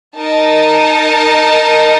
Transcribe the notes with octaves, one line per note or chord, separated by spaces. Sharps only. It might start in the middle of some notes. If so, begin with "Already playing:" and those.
D#4 A#4 D#5 A5